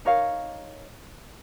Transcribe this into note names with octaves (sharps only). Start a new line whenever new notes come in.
D#4 A#4 C#5 F5